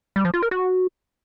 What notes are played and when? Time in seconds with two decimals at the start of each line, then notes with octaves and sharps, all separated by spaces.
0.16 G3
0.25 F3
0.34 F4
0.42 A#4
0.51 F#4